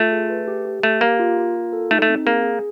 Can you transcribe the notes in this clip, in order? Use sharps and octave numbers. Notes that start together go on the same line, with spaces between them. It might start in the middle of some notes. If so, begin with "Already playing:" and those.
Already playing: A3 F4
G#4
B4
G4
G4
A3 G4
A#3 G4
F4
F4
F4
A4
A3 D#4
A3
C4
A#3 G#4
G#4